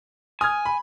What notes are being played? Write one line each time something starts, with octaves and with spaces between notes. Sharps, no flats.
G#5 D#6 F6 G#6
B5